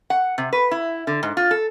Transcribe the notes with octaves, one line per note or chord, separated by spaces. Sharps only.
F#5
C3
B4
E4
D3
G#2
F4
A4